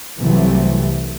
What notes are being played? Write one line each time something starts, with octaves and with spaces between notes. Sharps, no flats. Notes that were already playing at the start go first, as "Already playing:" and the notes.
C2 C3 E3 F#3 A3